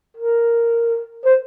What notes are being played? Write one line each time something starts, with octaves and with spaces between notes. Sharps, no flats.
A#4
C5